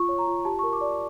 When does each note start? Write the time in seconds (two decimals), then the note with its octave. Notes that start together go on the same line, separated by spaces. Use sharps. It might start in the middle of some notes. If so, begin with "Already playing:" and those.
Already playing: F4 C#6
0.09 C#5
0.18 A#5
0.27 F4
0.45 G4 A5
0.59 A#4 C#6
0.73 D6
0.81 D5